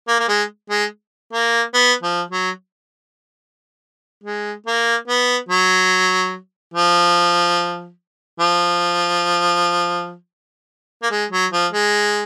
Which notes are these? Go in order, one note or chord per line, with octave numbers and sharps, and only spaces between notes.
A#3
A#3
G#3
G#3
A#3
B3
F3
F#3
G#3
A#3
B3
F#3
F3
F3
A#3
G#3
F#3
F3
G#3